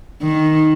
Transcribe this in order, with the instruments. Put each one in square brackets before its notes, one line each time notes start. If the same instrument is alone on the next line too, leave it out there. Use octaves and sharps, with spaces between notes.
[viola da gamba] D#3